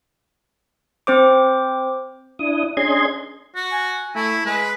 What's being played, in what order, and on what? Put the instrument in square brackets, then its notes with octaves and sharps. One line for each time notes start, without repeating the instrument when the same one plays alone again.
[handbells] C4 C5 D6
[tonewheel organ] D4 E4 D#6
C#4 D4 G#4 D#5 C6 G#6
[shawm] F#4
[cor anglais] G#5
[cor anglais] A3 [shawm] E4
[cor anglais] G#3 [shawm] B4